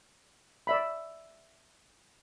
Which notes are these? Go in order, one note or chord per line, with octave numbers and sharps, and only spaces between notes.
D5 E5 B5